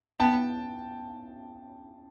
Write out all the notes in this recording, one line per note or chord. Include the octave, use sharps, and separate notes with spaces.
B3 G5 A5